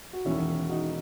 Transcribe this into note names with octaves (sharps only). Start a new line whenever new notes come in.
F#4
E1 E2 D#3 C#4 E4
D#4 F#4